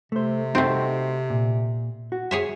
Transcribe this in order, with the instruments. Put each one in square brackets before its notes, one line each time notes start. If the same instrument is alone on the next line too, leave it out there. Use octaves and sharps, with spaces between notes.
[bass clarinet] C3 [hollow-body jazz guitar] A3 C5
[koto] A3 C4 [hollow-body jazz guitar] D#4 F#4 C5
[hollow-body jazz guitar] A#2
F#4
[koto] G#4 C#5 E5